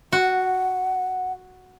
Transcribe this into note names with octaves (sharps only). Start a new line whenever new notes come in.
F#4 F#5